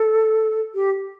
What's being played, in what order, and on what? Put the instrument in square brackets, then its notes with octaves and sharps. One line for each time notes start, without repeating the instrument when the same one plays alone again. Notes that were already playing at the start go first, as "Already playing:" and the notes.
Already playing: [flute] A4
G4